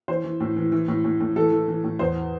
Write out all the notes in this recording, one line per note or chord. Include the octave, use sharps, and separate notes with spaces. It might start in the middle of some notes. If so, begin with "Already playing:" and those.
E3 C5
E3
A2
E3
E3
A2
A2
A2
E3 A4
E3
E3
A2
E2 C5